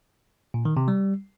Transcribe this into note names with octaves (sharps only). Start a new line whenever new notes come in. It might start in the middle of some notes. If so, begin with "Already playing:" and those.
A#2
D#3
C3
G3